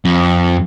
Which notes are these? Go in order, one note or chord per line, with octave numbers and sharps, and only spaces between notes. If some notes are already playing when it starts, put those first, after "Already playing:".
F2